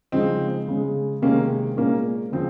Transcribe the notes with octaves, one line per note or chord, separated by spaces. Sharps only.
C#3 F3 G#3 C4 D#4
C#3 G#3
C3 D#3 G#3 A#3 C#4
A#2 G#3 A#3 C#4
C#3 F3 C4